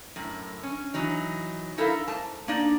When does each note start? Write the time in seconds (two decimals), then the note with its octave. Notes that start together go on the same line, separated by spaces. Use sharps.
0.16 F#2 A2
0.63 C#4
0.94 E3 F#3 D#4
1.78 D#4 E4 A4 A#4 E5 F5
2.08 G#2 A5
2.48 A#3 D4 D#4 D5